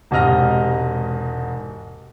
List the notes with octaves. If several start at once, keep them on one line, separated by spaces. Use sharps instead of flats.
E1 G#2 C3 D#5 F6 A#6